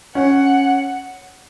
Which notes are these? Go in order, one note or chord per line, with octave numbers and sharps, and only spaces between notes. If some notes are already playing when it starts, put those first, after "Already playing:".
C#4 F#5